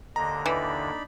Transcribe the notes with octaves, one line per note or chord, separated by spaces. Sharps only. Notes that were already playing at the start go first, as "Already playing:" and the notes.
D#2 D3 D#5 A#5
E3 D4 D#4 B5